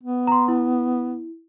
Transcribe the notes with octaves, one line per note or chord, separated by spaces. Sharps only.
B3
A#5 C6
E4